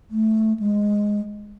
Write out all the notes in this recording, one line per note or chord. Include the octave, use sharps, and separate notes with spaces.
A3
G#3